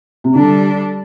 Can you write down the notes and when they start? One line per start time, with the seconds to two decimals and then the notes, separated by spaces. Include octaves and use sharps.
0.24 C3
0.35 D3 G3 D4 A4